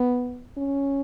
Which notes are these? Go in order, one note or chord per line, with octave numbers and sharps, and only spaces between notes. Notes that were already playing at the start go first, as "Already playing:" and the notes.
Already playing: B3
C#4